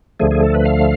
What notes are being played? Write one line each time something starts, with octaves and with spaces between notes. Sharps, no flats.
D2 D3 F3 A3 G#4
G#4
A4
B4
F5